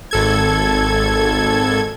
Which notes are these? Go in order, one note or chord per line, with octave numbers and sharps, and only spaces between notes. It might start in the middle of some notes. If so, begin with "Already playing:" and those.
G#1 A4 G#6